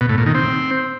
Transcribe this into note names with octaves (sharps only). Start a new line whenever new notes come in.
B2
A2
A#2
D#3
C4